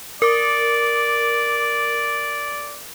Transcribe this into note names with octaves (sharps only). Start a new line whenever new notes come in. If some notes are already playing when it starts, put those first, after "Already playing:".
A#4 D5 D6